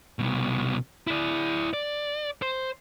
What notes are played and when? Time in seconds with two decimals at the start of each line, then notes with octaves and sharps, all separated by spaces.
0.19 C2 B2
1.07 E4 D5
1.73 D5
2.42 C5